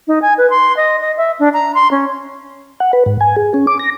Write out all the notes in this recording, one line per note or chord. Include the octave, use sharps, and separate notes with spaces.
D#4
G#5
B4
C6
D#5
D#5
E5
D4
A#5
C6
C#4
F#5
B4
G#2
G#5
G#4
C#4
D6
A#6